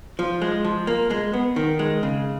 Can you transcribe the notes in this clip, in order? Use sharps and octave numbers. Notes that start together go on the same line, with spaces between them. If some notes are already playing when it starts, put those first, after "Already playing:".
F3
G#3
F3
A#3
G#3
B3
D#3
G#3
C#3